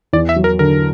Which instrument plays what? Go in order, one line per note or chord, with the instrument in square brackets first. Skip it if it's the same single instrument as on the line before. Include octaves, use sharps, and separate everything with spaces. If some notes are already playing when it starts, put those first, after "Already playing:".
[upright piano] E2 [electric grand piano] D5
[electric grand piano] E5
[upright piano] F#3
[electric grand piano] A#4
[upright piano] D3 [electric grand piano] A#4